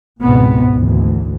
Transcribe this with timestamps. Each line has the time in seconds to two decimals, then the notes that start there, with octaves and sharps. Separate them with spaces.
0.22 G#1 C#2 G#2 B2 B3 C4
0.74 G#1 D2 E3